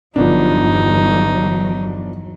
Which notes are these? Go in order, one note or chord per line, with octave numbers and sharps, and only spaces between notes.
G1 E2 F3 F#3 B3 D4 D#4